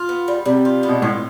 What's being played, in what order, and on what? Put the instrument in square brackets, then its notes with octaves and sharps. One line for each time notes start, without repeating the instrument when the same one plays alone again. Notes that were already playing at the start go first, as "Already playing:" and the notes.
Already playing: [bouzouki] F4
B3
G3
[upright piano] C3 [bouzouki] G3
[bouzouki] F4
B3
[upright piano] B2
[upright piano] A2 [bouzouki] F4